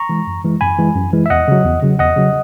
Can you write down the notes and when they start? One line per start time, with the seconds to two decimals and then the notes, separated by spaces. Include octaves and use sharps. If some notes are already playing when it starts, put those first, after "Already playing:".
Already playing: A#5 C#6
0.09 E3 G#3
0.27 F#2
0.44 E3 G#3
0.61 F#2 G#5 B5
0.78 E3 G#3
0.95 F#2
1.13 E3 G#3
1.26 E5
1.30 E2 D#5 F#5
1.48 C#3 F#3
1.65 E2
1.82 C#3 F#3
1.99 E2 D#5 F#5
2.17 C#3 F#3